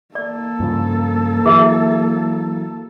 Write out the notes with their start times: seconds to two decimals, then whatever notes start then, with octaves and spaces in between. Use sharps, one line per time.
0.15 A#3 A4 D5
0.60 G2 C#3 F3
1.46 E3 F#3 G#4 A#4 E5